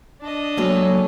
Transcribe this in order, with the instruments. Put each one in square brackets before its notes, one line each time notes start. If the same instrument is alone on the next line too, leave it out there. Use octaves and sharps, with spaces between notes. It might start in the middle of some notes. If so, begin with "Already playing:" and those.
[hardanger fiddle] D4 D#5
[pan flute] F#3 [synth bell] G#3 A#3 F#4 [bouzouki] G#4 A4 C#5